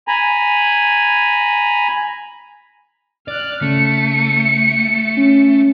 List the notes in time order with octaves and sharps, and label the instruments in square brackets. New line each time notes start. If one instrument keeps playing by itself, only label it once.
[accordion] G#5 A#5 B5
[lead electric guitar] D5 [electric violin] F6 F#6
[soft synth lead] C#3 [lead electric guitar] A3 [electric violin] C#7
[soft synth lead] C#4